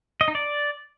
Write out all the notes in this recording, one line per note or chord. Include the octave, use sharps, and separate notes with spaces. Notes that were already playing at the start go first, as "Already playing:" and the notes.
D#5
D#4
D5